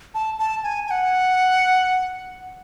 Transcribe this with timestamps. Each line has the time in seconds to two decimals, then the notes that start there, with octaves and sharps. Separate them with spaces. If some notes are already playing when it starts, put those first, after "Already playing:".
0.14 A5
0.39 A5
0.63 G#5
0.87 G#5
0.91 F#5